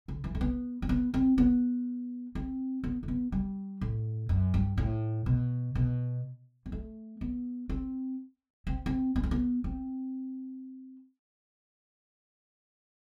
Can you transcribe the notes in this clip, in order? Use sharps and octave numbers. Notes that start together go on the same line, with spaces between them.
D3
E3
A3
B3
C4
B3
C4
B3
C4
B3
A3
B3
G3
A2
F#2
G2
A2
B2
B2
B3
A3
B3
C4
C4
C4
B3
C4
B3
C4